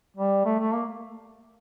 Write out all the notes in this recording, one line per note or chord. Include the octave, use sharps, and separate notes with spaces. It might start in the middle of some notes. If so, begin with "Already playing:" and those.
G3
A3
A3
A#3